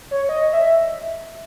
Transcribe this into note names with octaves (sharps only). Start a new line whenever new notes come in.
C#5
D#5
E5